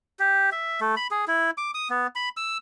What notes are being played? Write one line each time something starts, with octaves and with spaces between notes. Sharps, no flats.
G4
E5
A3
B5
G#4
E4
D6
D#6
B3
B5
E6